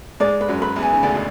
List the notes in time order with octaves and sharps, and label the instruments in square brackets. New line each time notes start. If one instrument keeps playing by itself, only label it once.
[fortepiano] G#2 G#3 [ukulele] D5
[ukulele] B4
[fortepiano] F#2 F#3
[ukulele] B4
[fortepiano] E2 E3
[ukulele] G#5
[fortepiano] C#3
[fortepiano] D2 D3 [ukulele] D5
[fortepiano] B2